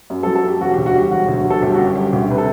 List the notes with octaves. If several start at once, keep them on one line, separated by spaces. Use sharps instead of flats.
F#2
A4
F#3
A4
F#2 G4
E1 F#4
G4
D2
F#4
G3 G4
E1 F#4
D2
F#3
A4
G1 G4
F#4
F#2 G4
G3 G4
D2 G4
C3 B4
A4